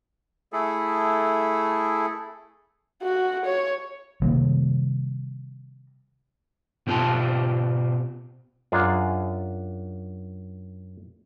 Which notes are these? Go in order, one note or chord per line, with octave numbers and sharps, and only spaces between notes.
A3 E4 G#4 A4
F#4
C#5
C3 D#3 G3 A#3
B2 C4 F4 G4 A5
F#2 D4 F4 G#4